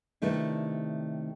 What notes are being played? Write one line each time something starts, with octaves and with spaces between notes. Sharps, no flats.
C3 D#3 A3 D4 E4 B4